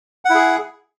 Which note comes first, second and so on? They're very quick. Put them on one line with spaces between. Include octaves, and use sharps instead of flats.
F#5 E4 G#4